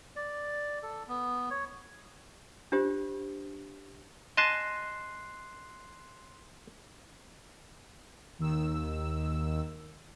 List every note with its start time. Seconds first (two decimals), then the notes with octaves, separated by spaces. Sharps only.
0.16 D5
0.83 A4
1.08 B3
1.51 C#5
2.72 D4 F4 G4 C5
4.37 D#5 G#5 A5 C6 F#6 C7
8.39 D#2 D#3 E6